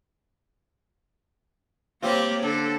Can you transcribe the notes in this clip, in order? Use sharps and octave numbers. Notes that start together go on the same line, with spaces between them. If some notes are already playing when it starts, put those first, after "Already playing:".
G3 A#3 C4 F4 G4 C#5
D3 A4